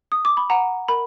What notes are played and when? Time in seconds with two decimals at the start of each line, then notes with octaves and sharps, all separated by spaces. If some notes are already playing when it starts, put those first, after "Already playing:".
0.12 D#6
0.25 D6
0.37 B5
0.50 F#5 A#5
0.88 A#4 B5